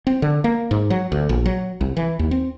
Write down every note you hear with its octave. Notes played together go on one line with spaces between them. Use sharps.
C4
D3
A#3
G#2
F#3
D2
A#1
F#3
C2
E3
D#2
C4